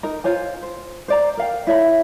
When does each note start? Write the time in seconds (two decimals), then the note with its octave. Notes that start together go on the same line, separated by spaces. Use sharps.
0.03 D#4 A#4
0.24 F4 C5 C#5 G#5
0.63 C5
1.08 C5 D5 A#5
1.37 A#4 F5 G5
1.67 E4 C#5 E5 B5